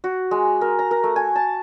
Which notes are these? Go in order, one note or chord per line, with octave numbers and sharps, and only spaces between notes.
F#4
G#3
A#4
A#5
A#4
A3
G#5
A5